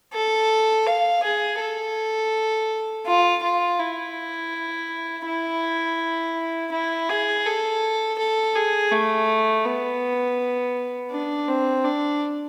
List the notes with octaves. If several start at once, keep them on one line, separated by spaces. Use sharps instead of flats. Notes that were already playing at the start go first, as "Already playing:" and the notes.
A4
F5
G#4
A4
F4
F4
E4
E4
E4
G#4
A4
A4
G#4
A3
B3
D4
C4
D4